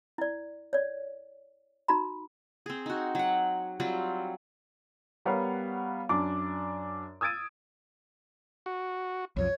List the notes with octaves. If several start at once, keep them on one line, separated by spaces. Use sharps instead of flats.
E4 D5
C#5 D5
D#4 F#4 A#5 B5
C4 G#4
D#4 F#4
F#3 F#5
F#3 G3 C4 F4
G3 B3 A#4 C#5 F5 F#5
F#2 D4 D5 D6
D#6 E6 G#6 A6 D7 D#7
F#4
C2 F#2 F3 C#5